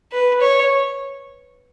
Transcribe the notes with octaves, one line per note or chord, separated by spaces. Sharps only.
B4
C#5